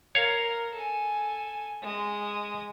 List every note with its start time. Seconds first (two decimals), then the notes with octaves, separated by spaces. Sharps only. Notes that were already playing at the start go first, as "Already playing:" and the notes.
0.15 A#4 C#5 F5
0.74 A4 G#5
1.83 G#3 D#6